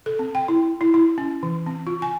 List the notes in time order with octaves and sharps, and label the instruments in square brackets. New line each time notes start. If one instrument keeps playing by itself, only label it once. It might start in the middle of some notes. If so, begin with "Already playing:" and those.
[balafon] A4
C4
G5
E4
E4
E4
C#4
E3
C4
F4
G#5